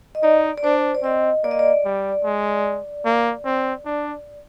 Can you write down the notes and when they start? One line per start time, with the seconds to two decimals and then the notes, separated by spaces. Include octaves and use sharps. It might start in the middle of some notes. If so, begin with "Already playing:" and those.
0.15 D#5
0.23 D#4 D5
0.58 D5
0.64 D4 C5
0.95 D5
1.03 C4 D#5
1.44 A#3 D5
1.51 D#5
1.59 D5
1.85 G3
2.24 G#3
3.05 A#3
3.45 C4
3.86 D4